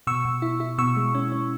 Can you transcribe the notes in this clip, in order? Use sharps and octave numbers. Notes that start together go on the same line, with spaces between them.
B2 C#6 E6
B2
E4
E4
B2 C#6 E6
G#3
C#4
C#4